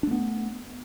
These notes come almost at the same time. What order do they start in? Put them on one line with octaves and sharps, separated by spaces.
D4 A3 B3